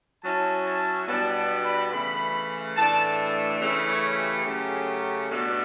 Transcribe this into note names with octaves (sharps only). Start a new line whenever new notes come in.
F#3 C#4 E4 A5
A5
B2 G3 B3 D4 A5
A5
B5
C#3 E3 A3 B5
A2 E3 A3 D4 A5
C#3 E3 A3 C#4 E4 E5
C#5
G4
C#3 F#3 A3 C#4
B2 A3 D4